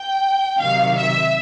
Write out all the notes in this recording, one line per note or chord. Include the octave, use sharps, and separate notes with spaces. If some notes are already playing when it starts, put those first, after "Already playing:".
Already playing: G5
C3 D#3 F#3 F5
E5